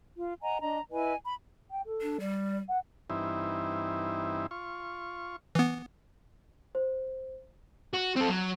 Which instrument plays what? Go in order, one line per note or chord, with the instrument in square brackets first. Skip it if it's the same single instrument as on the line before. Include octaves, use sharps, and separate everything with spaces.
[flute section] F4
D#5 F#5 G#5 A#5
D4 D#5 A#5
E4 B4 D#5 G#5
B5
[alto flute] G5
A4
[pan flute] D4
[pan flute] G3 [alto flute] D5
[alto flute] F#5
[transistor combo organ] G2 E3 C4 D#4 E4
F4 C#6
[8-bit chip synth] E3 B3
[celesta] C5
[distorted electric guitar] F#4
C4 A4
F#3